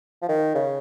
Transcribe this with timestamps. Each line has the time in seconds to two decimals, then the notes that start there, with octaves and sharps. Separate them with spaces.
0.22 F3
0.29 D#3
0.55 C#3